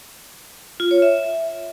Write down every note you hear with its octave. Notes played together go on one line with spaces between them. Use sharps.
F4
C#5
E5